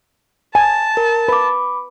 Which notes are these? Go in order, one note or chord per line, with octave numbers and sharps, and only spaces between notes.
G#5 A5
A#4
B4 B5 D6